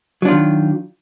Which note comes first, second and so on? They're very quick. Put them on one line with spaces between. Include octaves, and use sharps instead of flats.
F#3 D4 F4 D#3